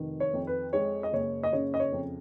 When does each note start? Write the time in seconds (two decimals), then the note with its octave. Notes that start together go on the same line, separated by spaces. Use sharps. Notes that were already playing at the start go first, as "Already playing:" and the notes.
Already playing: F1 D#3
0.20 C#5
0.33 F2
0.47 B4
0.73 G#3 C#5
1.03 D#5
1.12 F#1 C#5
1.43 D#5
1.53 C#3 C#5
1.74 D#5
1.80 C#5
1.93 F2